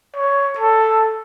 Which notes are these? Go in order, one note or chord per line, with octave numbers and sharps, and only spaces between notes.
C#5
A4